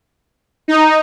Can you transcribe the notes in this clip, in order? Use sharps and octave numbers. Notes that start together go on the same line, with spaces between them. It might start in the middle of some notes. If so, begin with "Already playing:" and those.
D#4